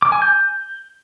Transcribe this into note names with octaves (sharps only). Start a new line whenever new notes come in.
D6
G#5
G6